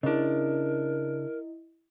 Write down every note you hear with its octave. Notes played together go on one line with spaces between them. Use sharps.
C#3 D4 E4 A#4 D#5